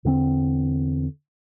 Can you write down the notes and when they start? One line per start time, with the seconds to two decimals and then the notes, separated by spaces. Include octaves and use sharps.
0.05 E2 D3 A#3 C4